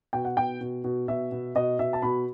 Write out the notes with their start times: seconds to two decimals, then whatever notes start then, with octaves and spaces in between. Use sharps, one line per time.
0.13 B2 G5
0.25 F#5
0.37 B2 G5
0.61 B2
0.84 B2
1.08 B2 E5
1.32 B2
1.55 B2 D#5
1.79 B2 E5
1.93 A5
2.02 B2 B5